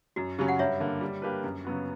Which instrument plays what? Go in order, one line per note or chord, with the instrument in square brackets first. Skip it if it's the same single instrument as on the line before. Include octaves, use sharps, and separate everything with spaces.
[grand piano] F#2 [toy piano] F#4
[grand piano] C#3 F#3 C#4 [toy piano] G4
[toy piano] F#5
[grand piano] G2 [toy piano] C#5 E5
[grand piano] D3 A#3
G3
A#3 D4 G4 B4
F#2
C#3 F#3 B3 F#4